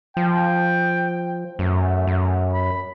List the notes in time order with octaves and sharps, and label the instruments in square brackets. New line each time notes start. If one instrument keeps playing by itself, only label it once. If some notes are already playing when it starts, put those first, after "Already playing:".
[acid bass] F3 [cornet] G5
[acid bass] F#2 [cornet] A3
[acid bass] F#2
[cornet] B5